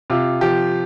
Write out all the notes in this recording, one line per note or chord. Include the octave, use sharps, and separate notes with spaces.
C3 F4
F3 G4